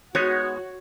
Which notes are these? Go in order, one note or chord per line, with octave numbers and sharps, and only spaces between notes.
G#3 B3 D#4 F#4 C#5